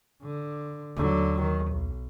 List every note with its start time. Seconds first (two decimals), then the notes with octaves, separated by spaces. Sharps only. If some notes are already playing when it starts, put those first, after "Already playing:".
0.23 D3
0.97 D#2 D3 F#3 A3
1.42 D#3
1.72 B1